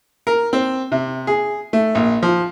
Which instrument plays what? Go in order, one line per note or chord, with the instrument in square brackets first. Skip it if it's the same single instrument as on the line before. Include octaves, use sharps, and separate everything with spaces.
[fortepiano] A#4
C4
C3
G#4
A3
A#1
F3